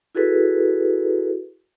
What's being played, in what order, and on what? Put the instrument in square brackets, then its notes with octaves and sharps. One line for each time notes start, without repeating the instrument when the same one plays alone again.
[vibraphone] E4 F#4 G#4 A4 B4